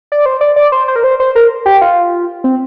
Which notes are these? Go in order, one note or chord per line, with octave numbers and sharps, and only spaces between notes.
D5
C5
D5
D5
C5
C5
A#4
C5
C5
A#4
G4
F4
C4